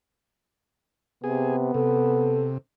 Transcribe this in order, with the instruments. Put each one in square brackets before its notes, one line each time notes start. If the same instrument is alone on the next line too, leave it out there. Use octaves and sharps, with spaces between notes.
[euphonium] C3 [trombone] B3 [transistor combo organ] G#4
[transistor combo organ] C3 [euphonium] A4